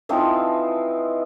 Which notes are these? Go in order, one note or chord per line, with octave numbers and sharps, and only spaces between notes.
E3 F3 C4 D#4